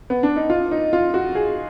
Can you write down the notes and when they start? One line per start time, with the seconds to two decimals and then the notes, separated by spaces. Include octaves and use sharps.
0.10 B3
0.23 D4
0.36 D#4
0.50 F4
0.71 D#4
0.93 F4
1.14 F#4
1.35 G#4